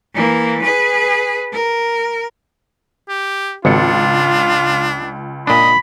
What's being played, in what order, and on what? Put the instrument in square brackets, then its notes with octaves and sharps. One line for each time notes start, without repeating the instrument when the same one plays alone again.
[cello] E3 A#3
G#4 B4
A#4
[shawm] G4
[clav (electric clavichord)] G#1 [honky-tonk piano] C#2 C#7 [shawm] D4 [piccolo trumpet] F4
[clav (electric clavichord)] A#2 D4 [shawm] D#5 [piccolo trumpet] B5